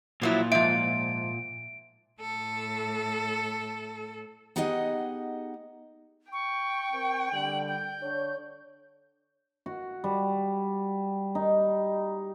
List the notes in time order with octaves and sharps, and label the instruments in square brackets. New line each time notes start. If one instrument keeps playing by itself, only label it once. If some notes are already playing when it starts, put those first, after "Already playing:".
[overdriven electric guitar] A#2 [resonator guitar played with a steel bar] F3 F#3 E4
[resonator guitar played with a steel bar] G#2 F3 [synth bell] E5 [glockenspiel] D7
[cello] A2 A4
[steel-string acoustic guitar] B3 D#4 G4 G#4 D#5 F#5
[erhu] G5 [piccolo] C#6
[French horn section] C4 A#4
[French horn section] D3 G3 [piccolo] F#7
[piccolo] G6
[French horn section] D3 D4 C#5
[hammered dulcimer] F#4
G3
D#4